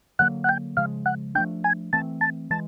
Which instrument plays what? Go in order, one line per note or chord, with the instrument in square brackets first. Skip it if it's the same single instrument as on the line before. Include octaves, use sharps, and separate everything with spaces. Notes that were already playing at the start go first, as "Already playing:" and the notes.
[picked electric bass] D3 F#3 A#3 [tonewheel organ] F#5
[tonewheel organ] F#5
G5
[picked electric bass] C#3 F3 G#3 [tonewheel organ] F5
[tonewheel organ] F#5
[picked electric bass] F3 A3 D4 [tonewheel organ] G5
[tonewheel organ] G#5
[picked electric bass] E3 A3 C4 [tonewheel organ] A5
[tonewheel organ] A5
[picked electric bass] E3 G#3 [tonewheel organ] A5